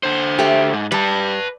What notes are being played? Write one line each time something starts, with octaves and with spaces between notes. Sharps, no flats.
D3 C5
A3 G4
G#2
G3 B4 A5